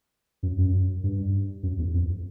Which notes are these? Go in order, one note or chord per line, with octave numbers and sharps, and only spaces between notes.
F#2
F#2
G2
F#2
E2
F2